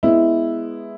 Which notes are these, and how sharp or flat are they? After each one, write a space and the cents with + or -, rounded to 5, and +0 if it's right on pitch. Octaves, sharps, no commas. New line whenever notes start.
G#3 +0 B3 +0 E4 +0